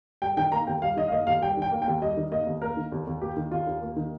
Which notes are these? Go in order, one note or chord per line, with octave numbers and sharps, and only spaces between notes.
G3 G5
D#3 G5
A#3 A#5
D#2 G5
G3 F5
D#3 D#5
F5
A#3 D#5
D#2 F5
G3 G5
D#3 G5
A#3
G5
D#2
G3 D#5
D#3
A#3 D#5
D#2
A#3 A#4
D#3
D#2
D#2
A#3 G4
D#3
D#2 F4
D#2
A#3
D#3